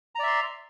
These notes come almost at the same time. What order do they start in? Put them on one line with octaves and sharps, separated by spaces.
A#5 D5 E5 C6